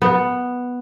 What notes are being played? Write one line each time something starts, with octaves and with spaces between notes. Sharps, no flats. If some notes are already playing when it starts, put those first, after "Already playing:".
B3